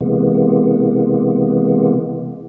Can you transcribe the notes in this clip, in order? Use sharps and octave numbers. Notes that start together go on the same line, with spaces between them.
C3 E3 G#3 A#3 B3